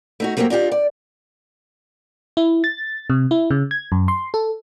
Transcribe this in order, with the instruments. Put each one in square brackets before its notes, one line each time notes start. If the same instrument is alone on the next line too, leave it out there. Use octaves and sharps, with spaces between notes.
[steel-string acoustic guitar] A3 D#4 F#4
F#3 A3 A#3 C4 E4 G4
D4 D#4 F4 G4
D5
[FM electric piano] E4
A6
C3
E4
C#3
G#6
F#2
C6
A4